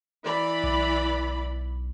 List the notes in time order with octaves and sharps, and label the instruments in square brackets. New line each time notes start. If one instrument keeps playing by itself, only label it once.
[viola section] E3 D5 B5
[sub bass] B1